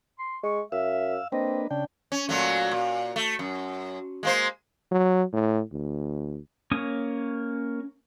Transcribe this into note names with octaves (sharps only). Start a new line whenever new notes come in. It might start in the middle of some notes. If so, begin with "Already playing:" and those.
C6
G#3 C#6
F#2 E5 F5 E6
A#3 C4 D4 B4 D#5
C#3 D4 G5
C#4
A#2 F#3 A3
A#2
A3
F#2
G#3 A#3 C5
F#3
A2
D2
A#3 C#4 C#5 D#6